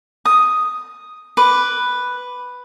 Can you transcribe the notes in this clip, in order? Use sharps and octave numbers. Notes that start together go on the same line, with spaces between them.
D#6
B4 D6